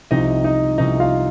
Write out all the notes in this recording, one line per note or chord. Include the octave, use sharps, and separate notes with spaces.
C2 C3 F3 D#4 D#5
D#4 D#5
C2 C3 F3 D#4 D#5
F4 F5